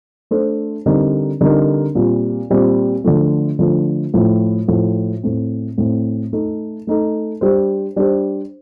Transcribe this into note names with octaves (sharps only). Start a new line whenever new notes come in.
A3 D4 A4 C5
D3 G3 C4 D#4 A#4
D3 G3 C4 D#4 A#4
A#2 G3 C4
A#2 G3 C4
D3 F3 A3
D3 F3 A3
A2 F3 A3
A2 F3 A3
A2 A3 C4
A2 A3 C4
A3 D#4 A4
A3 D#4 A4
G3 D4 G4 C5
G3 D4 G4 C5